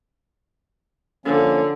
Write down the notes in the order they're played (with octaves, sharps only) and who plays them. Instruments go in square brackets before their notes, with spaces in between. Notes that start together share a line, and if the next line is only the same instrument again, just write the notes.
[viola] D3 [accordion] F3 A#3 C#4